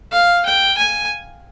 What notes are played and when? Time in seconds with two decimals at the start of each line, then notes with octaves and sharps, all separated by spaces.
0.12 F5
0.46 G5
0.78 G#5